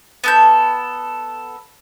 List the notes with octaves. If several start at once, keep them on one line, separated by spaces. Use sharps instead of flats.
B3 A4 G6